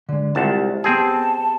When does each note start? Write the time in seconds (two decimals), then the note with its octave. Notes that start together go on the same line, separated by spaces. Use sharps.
0.09 D3 G#3
0.35 C2 G#3 F4 F#5 A5
0.84 B3 C4 G4 G#4 A5